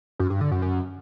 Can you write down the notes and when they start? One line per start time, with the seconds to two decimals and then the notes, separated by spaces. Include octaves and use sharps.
0.19 F#2
0.30 G2
0.41 D3
0.51 F#2
0.62 F#2